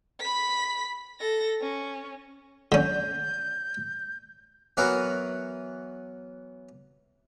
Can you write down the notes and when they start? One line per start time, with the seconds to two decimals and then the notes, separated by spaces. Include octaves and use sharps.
0.20 B5 B6
1.20 A4 A#6
1.61 C#4
2.72 D3 C#4 G6
4.77 E3 F#3 B3 F#4 A#4